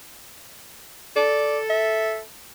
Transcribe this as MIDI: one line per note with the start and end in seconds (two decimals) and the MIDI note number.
1.16 2.22 69
1.16 1.58 74
1.70 2.20 76